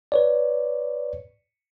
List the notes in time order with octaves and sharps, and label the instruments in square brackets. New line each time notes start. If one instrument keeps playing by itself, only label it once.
[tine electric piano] B4 C#5 D5